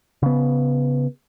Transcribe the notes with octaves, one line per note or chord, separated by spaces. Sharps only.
C#3 B3